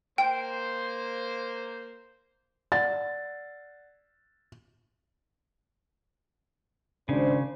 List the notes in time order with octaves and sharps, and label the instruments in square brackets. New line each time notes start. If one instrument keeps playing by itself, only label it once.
[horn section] A#3 C5 [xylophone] G5
[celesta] D5 F#5 [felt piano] A6
[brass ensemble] G#1 D4 C5 [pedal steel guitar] C#3